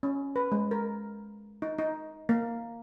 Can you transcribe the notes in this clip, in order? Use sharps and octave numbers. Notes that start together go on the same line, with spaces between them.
C#4
B4
G#3
A#4
D#4
D#4
A#3